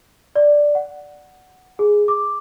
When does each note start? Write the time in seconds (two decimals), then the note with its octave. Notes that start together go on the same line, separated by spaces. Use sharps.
0.36 D5
0.75 F#5
1.79 G#4
2.08 D6